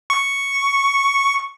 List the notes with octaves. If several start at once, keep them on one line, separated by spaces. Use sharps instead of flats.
C#6